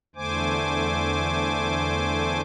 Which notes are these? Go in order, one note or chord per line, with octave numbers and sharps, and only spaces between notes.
E2 D3 A3 C5 G#5 D6